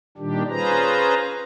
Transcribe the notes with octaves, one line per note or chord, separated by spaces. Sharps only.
A#2 D#3 G3 D4 G4
C#4 F4 G#4 B4 C5 A#5